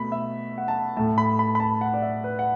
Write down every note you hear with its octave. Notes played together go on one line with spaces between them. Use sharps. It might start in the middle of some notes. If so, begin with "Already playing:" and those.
Already playing: B2 A3 B5
E5
F#5
A5
A2 A3 A5
B5
B5
B5
A5
F#5
D5
E5
B4
F#5